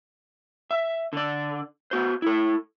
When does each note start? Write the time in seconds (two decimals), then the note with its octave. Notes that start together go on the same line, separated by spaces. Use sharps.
0.71 E5
1.13 D3 D5
1.91 B3 F#4 C5
2.22 E4 A4